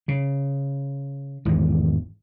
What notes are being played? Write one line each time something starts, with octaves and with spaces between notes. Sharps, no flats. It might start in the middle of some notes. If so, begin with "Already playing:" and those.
C#3
G#1 E2 G#2